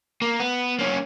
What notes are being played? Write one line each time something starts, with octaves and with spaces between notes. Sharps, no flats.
A#3
B3
A#3 C#4